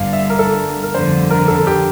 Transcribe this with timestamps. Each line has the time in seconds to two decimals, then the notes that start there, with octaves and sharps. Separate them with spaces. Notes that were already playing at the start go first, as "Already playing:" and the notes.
Already playing: G1 G2 D3 F5
0.13 E5
0.30 A#4
0.39 A4
0.83 A#4
0.94 G1 F2 D3 C5
1.31 A#4
1.48 A4
1.67 G4